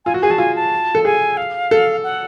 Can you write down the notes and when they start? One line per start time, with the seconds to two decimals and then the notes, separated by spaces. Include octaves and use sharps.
0.05 F4 G#5
0.14 F#4
0.22 G#4 G#5
0.30 F#4 A5
0.38 F4 G#5
0.56 A5
0.95 A4
1.05 G#4 G#5
1.37 F5
1.71 A4
2.04 F#5